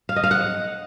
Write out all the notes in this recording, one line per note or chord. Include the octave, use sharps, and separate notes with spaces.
F5
D#5
F5
F#5